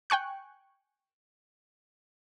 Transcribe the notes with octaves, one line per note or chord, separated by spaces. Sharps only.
G5 G#5 C#6 F#6